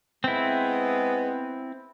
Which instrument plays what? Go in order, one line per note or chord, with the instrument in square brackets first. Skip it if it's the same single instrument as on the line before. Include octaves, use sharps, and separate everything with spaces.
[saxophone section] G#3 B3 [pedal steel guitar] C4 E4